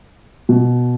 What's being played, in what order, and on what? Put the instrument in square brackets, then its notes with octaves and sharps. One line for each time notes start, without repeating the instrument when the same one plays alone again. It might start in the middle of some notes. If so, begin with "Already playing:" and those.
[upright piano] B2